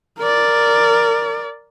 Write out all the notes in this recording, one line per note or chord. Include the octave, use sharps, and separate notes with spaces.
A#4 D5